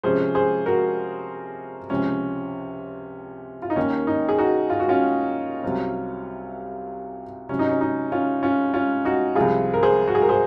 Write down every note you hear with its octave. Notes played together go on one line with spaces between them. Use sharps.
C3 F3 G#3 C#4 G#4 C5
G#4 C5
F#4 A#4
C#2 C3 F3 C#4
F4
D#4
D#2 D#3 A#3 C#4
D#4
G#4
D#4 F#4
F4
F#4
C#4 F4
C2 C3 F#3 C4
C3 F#3 C#4
D#4
C#4
D#4
C#4 F4
C#4 F4
C#4 F4
D#4 F#4
C2 C3 F3 C4 F4 G#4
A#4
G#4 C5
F#4
G#4
A#4
G#4 C5